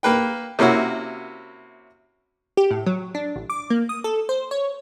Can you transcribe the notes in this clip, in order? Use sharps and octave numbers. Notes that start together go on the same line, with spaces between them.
A#3 B4 G5
C3 A#3 C#4 E4 F#4
G4
A2
F#3
D4
A1
D6
A#3
D#6
A4
C5
C#5